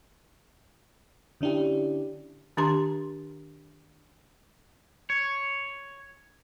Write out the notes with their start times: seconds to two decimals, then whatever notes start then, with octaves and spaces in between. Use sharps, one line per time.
1.41 D3 C#4 D4 E4 G4
2.57 D#3 D4 G4 A#5 C6
5.10 C#5